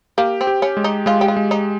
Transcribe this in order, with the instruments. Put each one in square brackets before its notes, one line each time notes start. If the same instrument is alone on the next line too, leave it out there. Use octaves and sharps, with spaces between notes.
[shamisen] A#3 [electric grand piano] G4
[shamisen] C4
[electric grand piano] G4
[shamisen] C#4
[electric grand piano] G#3
[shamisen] D#4
[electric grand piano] G#3 [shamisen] F4
[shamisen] G4
F4
[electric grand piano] G#3
[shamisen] D#4